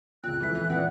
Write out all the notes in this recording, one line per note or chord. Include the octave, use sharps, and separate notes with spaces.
C#2 A#2 C4 F#6
D#1 F2 E3 E4 B6
E3
A#2 E3 B3 C4 F#5